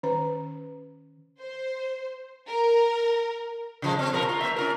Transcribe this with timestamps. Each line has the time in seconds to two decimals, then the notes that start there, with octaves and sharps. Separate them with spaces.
0.03 D#3 C#4 B4 A#5
1.40 C5
2.47 A#4
3.82 C#3 F3 G#3
3.99 C4 C#5
4.13 B2 F3 A#4
4.29 F4
4.41 A#3 E5
4.56 C#4 F4 A#4